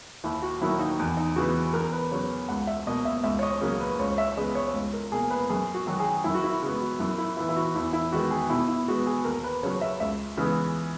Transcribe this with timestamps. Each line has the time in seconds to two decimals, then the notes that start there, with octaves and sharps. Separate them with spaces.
0.24 D#2 E4
0.42 F#4
0.61 D#3 F#3 A#3 E4
0.79 D#4
0.99 E2
1.17 D#4
1.36 C#3 E3 B3 F#4
1.73 E2 A#4
1.92 B4
2.11 C#3 F#3 B3 C#5
2.49 C#2 F#5
2.67 E5
2.87 B2 A#3 D#5
3.05 E5
3.24 C#2 E5
3.39 C#5
3.43 D#5
3.61 C#3 F#3 A#3
3.80 B4
3.99 C#2 C#5
4.18 E5
4.37 C#3 G#3 B3 D#5
4.55 C#5
4.74 C#2
4.93 A#4
5.12 B2 A#3 G#4
5.30 B4
5.50 F#2 G#4
5.74 F#4
5.87 D#3 F#3
6.00 G#4
6.24 F#2 E4
6.34 F#4
6.44 E4
6.62 C#3 G#3 B3
6.81 F#4
7.00 F#2 E4
7.18 E4
7.37 E3 B3 E4
7.49 E4
7.56 F#4
7.75 E2 E4
7.93 E4
8.12 D#3 G#3 B3 F#4
8.31 G#4
8.50 B2 E4
8.68 E4
8.88 G#3 B3 F#4
9.06 G#4
9.25 D#2 A#4
9.44 B4
9.63 C#3 F#3 C#5
9.81 E5
10.00 C#2 E5
10.37 C#3 E3 G#3 B3